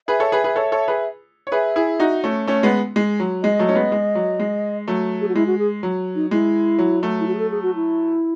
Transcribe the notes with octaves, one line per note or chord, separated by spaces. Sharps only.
G#4 B4 E5
A4 C#5
G#4 B4
G#4 B4
A4 C#5
A4 C#5
G#4 B4
C#5
G#4 B4 E5
E4 G#4
D#4 F#4
A3 C#4
A3 C#4
G#3 B3
G#3
F#3
G#3 D#5
F#3 A3
C#4
G#3 B3
G#3
F#3
G#3
F#3 A3
G#4
F#4
G#3 E4
F#4
G#4
F#3
D#4
G#3 E4
F#3
F#3 A3
E4
F#4
G#4
A4
G#4
F#4
E4